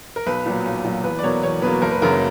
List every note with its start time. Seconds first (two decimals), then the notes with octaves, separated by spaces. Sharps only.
0.16 A#4
0.26 B1 B4
0.46 A#2 F#3
0.65 B1
0.84 A#2 F#3
1.04 E2 B4
1.19 D5
1.23 B2 F#3 A#3 C#5
1.43 E2 C#5
1.62 B2 F#3 A#3 B4
1.82 F#1 A#4
1.91 B4
2.00 F#2 C#3 F#3 A#3 A#4